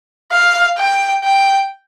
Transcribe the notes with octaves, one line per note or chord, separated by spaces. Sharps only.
F5
G5
G5